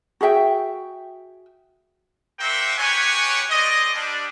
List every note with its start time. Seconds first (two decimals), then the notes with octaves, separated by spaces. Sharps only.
0.21 F#4 G#4 E5 G5
2.40 A#3 F#4 A#4 C5 E5 G5
2.78 C#4 F#4 G4 B4 C#5 G#5
3.50 C4 G#4 D5 D#5
3.94 G3 D4